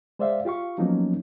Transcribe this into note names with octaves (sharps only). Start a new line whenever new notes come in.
G#3 C5 D5 E5 F5
F4 G4 F5 C#6
F3 F#3 A#3 B3 C#4 D#4